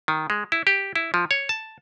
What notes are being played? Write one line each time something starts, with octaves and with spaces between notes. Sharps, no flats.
D#3
G#3
E4
G4
E4
F3
C#5
A5